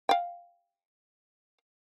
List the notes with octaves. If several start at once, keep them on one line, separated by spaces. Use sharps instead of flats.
F5 G5